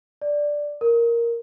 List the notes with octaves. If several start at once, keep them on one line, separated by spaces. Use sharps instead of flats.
D5
A#4